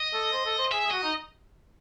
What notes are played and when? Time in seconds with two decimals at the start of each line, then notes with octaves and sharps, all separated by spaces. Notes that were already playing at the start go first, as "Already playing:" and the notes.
Already playing: D#5
0.14 A4
0.33 C5
0.46 A4
0.59 C5
0.72 G#4 E5
0.86 G#4
0.91 F#4 D#5
1.03 D#4